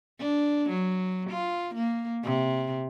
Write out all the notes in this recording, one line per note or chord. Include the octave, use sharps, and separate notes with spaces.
D4
F#3
F4
A#3
C3